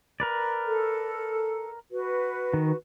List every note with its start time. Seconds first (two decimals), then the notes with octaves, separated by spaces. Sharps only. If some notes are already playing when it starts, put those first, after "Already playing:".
0.20 A#4 B4 D5
0.65 A4
1.92 F#4 B4
2.54 D#3